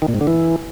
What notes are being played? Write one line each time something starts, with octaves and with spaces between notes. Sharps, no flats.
D#3
A#2
G#2
D3
E3